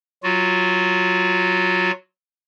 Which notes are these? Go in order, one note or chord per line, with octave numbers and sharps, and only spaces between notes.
F#3 F4 F#4